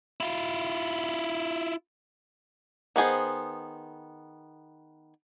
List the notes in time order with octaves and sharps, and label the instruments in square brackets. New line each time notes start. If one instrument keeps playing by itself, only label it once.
[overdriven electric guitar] E4 F4
[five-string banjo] D#3 B3 G#4 C5